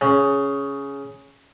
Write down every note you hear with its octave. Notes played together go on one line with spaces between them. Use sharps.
C#3